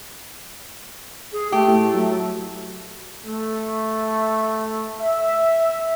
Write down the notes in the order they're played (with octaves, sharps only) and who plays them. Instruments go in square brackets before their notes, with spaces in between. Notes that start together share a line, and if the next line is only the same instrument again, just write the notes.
[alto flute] G#4
[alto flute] A3 [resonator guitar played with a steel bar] G4
[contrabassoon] A2
F#3
[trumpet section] A3
E5